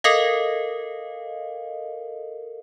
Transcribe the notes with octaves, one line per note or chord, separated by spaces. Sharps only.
A4 A#4 D#5 F5